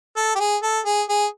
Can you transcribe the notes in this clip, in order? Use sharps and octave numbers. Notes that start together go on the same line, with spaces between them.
A4
G4
G#4
A4
G#4
G#4